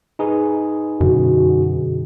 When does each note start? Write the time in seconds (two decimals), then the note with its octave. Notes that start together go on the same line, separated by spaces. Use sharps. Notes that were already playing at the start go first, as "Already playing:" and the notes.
0.19 D#4 G#4 B4
1.01 F#2 B2 D3 F#3 F#4